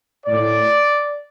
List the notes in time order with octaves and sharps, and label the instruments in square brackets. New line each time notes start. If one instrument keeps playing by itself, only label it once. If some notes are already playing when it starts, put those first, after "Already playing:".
[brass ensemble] A2 D5